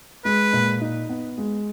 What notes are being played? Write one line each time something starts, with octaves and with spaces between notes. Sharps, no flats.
G#3 B4
A#2
D#4
B3
G#3